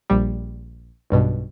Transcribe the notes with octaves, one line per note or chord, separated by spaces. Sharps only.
A#1 G3
B1 G2 B2